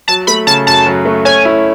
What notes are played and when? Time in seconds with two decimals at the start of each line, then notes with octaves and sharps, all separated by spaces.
0.08 F#3 A5
0.27 A3 B5
0.47 C#3 A5
0.67 F#2 A5
0.87 F#3
1.05 A3
1.25 C#4 G#5
1.45 E4